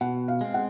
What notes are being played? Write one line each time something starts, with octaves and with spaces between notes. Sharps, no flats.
B2 F#5
F5
G#3 C4
F#5